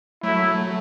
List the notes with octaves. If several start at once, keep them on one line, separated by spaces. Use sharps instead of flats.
F#3 A3 E4